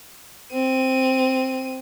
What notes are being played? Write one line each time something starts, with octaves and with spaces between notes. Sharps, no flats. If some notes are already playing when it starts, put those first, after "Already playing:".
C4 D#7